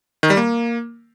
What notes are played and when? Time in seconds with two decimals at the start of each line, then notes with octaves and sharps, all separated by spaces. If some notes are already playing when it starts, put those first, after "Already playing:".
0.23 D#3
0.30 G3
0.37 A#3